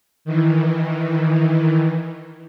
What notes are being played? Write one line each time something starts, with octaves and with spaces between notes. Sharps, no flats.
D#3 E3